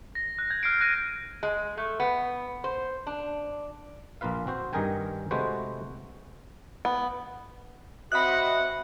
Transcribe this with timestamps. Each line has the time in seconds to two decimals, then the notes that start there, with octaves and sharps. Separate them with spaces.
0.15 A#6
0.39 F#6
0.50 G6 G#6
0.63 F6 G6 C7 D7
0.81 F#6 A#6 D#7
1.43 G#3
1.77 A3
2.00 B3
2.64 C5
3.07 D4
4.21 A#1 A#3 F4 B4 F5
4.47 C4 F#4 C5
4.73 G2 D#3 G#4 A#4 G5 G#5
5.31 C3 G#3 A3 F#4 B4 C5
6.85 B3
8.12 C4 F#4 D#5 E5 F#5 B5 F#6